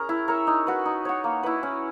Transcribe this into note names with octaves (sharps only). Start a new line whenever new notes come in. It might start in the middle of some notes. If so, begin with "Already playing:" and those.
Already playing: C#4 G#4 A#4
E4
A#4 C#5 E5
D#4
F#4 B4
D#4
F#4 C#5
A#3
E4 B4
C#4